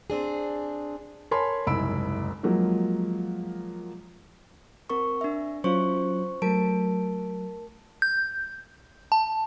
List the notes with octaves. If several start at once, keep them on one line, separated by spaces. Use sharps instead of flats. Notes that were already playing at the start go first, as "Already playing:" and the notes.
C4 D4 G#4
A#4 C#5 G#5 A5 B5 C6
F#1 C2 G#2 B5 E6 D7
F3 F#3 G#3 A#3
C4 A#4 C#6
D4 E5
F#3 C#4 F4 C5 C#6
F#3 A3 A#4 A5 D7
G6
A5